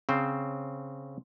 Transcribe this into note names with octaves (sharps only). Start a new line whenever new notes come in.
C#3 C4 C5